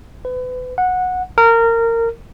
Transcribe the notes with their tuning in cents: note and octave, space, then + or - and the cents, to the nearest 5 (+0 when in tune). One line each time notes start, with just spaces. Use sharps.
B4 +30
F#5 -15
A#4 -20